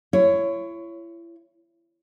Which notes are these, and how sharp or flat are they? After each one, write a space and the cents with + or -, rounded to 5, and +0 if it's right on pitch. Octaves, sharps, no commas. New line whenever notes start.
E4 +35 C#5 +5